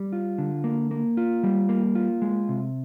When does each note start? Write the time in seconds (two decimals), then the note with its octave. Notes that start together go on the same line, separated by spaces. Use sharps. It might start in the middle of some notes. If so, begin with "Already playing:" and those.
Already playing: G3
0.13 F4
0.38 D3
0.64 A#3
0.91 A#3
1.17 F4
1.43 G3
1.69 A#3
1.95 F4
2.22 G#3
2.49 C3